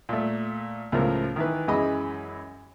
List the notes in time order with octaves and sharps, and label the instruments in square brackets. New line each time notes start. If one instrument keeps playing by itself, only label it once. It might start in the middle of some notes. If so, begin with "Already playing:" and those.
[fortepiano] A#2 A3
C#2 A2 F3 A3 F4 A#4
D#3 E3 B4
F#2 E3 G#3 D#5 B5